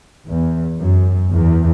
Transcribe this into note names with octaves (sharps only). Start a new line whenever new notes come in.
E2
F#2
E2